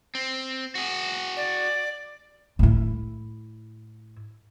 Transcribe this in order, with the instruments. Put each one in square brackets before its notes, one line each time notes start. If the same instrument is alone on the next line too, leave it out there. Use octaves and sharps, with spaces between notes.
[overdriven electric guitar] C4
F#4 G#4
[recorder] D5
[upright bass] A2 E4